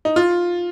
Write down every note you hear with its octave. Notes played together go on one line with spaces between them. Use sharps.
D#4
F4